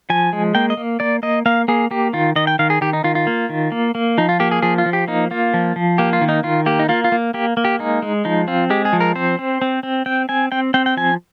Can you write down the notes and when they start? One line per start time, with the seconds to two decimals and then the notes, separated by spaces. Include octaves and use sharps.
0.10 F3 G#5
0.33 G#3
0.55 A#3 G5
0.70 D#5
0.77 A#3
1.00 A#3 D5
1.23 A#3 D#5
1.46 A#3 F5
1.68 A#3 G#4
1.91 A#3 G4
2.13 D#3 F4
2.36 D#3 D#5
2.47 G5
2.59 D#3 F5
2.70 G#4
2.81 D#3 G4
2.93 D#4
3.04 D#3 F4
3.15 F4
3.27 A#3
3.49 D#3
3.72 A#3
3.95 A#3
4.18 F3 D#4
4.29 F4
4.40 A#3 G4
4.51 G#4
4.62 F3 G#4
4.78 F4
4.86 F3
4.93 G4
5.08 A#3 D#4
5.31 A#3 F4
5.54 F3
5.76 F3
5.98 A#3 G4
6.13 F4
6.21 D#3
6.29 D#4
6.43 D#3 F4
6.66 A#3 G4
6.79 D#4
6.89 A#3 F4
7.04 F4
7.12 A#3
7.34 A#3 G4
7.57 A#3
7.65 G4
7.79 G#3 D#4
8.02 G#3
8.25 F3 D#4
8.48 C4 F4
8.70 G#3 G4
8.85 G#4
8.93 F3
9.00 A#4
9.16 C4 C5
9.39 C4
9.62 C4
9.83 C4
10.06 C4 G5
10.29 C4 G#5
10.52 C4 G5
10.74 C4 G5
10.86 G5
10.97 F3 G#5